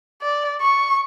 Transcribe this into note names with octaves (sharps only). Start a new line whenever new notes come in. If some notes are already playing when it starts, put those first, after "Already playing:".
D5
C#6